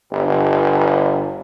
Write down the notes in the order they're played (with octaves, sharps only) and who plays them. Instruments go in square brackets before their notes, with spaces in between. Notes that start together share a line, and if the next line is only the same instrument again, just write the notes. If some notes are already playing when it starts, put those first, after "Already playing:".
[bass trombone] G1